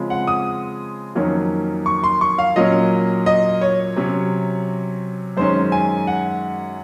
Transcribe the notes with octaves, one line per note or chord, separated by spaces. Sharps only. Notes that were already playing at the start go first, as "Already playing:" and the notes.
Already playing: C#3 F3 G#3 C4
F#5
D#6
F2 D#3 F#3 A#3 C#4
C#6
C6
C#6
F5
A#2 F#3 A#3 C#4 D#5
D#5
C#5
C3 F#3 C#4
F#2 D#3 G#3 C#4 C5
G#5
F#5